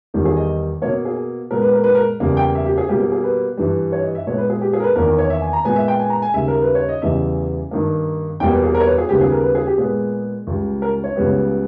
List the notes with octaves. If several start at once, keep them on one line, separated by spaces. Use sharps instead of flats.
E2 D#3 G3
G#4
D#5
B2 A#3 C#5
G#4
A#2 G#3 B3 A#4
B4
A#4
B4
A#4
E2 C#3 G3 A#3
G5
E5
G4
G#4
B2 G3 A#3 G4
G#4
G#4
B4
G2 E3 G3
C#5
D#5
E5
A#2 G#3 B3 C#5
B4
G#4
G4
G#4
A#4
B4
E2 D#3 A#3 A#4
A#4
C#5
E5
G#5
A#5
A#2 G#3 B3 G#5
E5
G5
G#5
A#5
G#5
D#2 C#3 G3 E5
A#4
B4
C#5
D#5
E2 C#3 E3 G3 E5
G2 D#3 A#3
E2 B2 G3 A#3 G5
B4
G#4
A#4
C#5
B4
G#4
D#2 C#3 G3 B3 G4
G#4
A#4
B4
G#4
G4
A#2 G#3 B3 G#4
C#2 C#3 G3
A#4
C#5
C#2 C#3 G3 B3